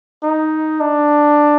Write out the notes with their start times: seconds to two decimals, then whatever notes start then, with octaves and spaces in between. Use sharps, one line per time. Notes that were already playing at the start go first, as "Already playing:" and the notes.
0.24 D#4
0.81 D4